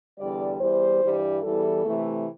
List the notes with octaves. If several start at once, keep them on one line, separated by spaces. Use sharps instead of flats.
E2 D3 G3 D5
E2 E3 G3 C5
G2 E3 G3
E2 E3 G3 A4
C3 E3 A3